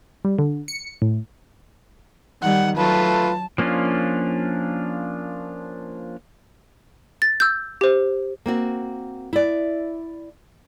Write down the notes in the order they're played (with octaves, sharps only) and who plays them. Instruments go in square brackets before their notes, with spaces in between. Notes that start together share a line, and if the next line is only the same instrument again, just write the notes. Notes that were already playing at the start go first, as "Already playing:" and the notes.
[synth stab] G3
D3
C#7
A2
[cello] D#3 G3 [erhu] F#5
[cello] F#3 [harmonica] A3 F4 B4 [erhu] A5
[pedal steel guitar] F3 A#3 C#4 D4 F4
[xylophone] A6
E6 G6
G4 C5
[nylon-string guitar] A#3 C4 F#4
E4 D5